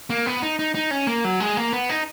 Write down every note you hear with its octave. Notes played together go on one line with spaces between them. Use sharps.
A#3
B3
D#4
D#4
D#4
C#4
A#3
F#3
G#3
A#3
B3
D#4